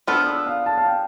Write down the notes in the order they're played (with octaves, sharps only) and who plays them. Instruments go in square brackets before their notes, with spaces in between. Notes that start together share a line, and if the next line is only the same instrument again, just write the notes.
[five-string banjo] F3 B3 D4 A4 [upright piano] F6
[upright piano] E6
F5
A5
F5
G5